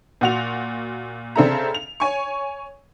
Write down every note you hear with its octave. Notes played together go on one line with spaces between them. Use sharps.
A#2 F#4 F7
C#3 C4 D4 A4 E5 A#5
F7
C#5 G#5 C#6